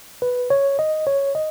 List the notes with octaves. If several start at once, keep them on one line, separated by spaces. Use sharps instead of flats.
B4
C#5
D#5
C#5
D#5